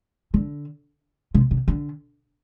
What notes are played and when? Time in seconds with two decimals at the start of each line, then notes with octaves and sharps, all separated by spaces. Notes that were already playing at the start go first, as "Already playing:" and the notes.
0.34 D3
1.34 C3
1.51 C3
1.68 D3